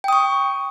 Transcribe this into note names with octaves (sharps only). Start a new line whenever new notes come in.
G5 C#6 D#6